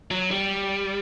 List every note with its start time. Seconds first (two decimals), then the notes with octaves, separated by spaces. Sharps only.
0.11 F#3
0.31 G3